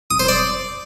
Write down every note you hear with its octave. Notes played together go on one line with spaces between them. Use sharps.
D#6
C5
D5